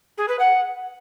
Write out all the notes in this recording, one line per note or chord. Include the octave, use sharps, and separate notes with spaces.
G#4
B4
F#5